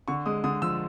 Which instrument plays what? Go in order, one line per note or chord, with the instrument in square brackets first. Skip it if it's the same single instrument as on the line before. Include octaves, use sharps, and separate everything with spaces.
[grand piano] D3 C#6
G#3 D#6
D3 D#6
F3 E6